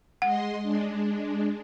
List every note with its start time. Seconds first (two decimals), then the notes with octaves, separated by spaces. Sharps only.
0.22 G#3 D#5 F#5 C6
0.63 G#3 D4